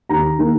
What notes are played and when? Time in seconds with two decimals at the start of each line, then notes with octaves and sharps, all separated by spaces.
0.09 D#2 A#5
0.39 D#3 A#3